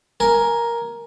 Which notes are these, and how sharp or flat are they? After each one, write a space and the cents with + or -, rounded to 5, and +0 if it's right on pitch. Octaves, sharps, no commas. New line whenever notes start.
A#4 +5 G#5 +10